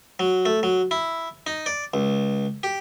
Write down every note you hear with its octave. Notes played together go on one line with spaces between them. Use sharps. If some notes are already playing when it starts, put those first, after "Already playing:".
F#3
A3
F#3
E4
D#4
D5
C#2
G4